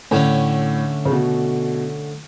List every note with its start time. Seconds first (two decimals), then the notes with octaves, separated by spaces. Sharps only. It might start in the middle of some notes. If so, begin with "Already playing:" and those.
0.11 A2 D3 A3 C#4
1.05 C#3
1.11 B2